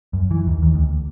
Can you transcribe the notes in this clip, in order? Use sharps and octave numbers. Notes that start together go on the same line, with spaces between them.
F#2
E3
D#2
D#2
D2